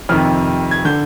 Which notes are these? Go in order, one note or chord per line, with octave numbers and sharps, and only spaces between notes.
F2 C3 D#3 F6
G#6
D3 G6